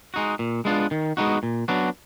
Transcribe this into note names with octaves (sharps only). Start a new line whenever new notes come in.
G#3 D#4 F#4
A#2
G#3 B3 D4 F4
D#3
G#3 B3 D#4 F#4
A#2
F#3 B3 D4 F#4